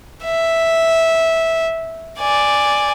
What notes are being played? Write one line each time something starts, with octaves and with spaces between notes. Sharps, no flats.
E5
D5 G#5